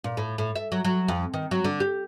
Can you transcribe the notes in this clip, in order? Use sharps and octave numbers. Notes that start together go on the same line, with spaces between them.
A#2
A2
A2
E5
F#3
F#3
F2
D#3
F#3
D3
G4